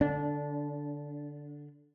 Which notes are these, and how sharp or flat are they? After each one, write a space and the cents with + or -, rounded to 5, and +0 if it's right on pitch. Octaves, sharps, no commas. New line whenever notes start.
D3 +0 D4 -20